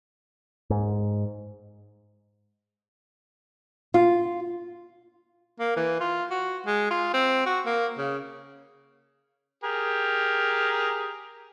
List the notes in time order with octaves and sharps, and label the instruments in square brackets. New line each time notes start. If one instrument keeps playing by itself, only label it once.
[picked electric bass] G#2
[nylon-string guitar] F4
[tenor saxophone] A#3
E3
F4
F#4
G#3
F4
C4
F#4
A#3
C#3
[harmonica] G4 G#4 A#4